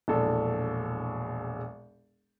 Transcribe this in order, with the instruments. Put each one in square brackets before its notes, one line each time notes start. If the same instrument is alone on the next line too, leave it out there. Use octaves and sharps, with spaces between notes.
[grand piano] E1 A#1 A4